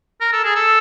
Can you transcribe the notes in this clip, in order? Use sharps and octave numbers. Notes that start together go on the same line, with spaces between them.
A#4
A4
G#4
A4